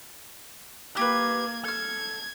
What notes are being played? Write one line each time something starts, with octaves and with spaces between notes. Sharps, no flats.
A#3 G4 A#4 B4 G#6
A4 F6 G#6